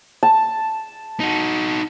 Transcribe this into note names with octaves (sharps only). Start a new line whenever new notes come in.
A5
D#4 F#4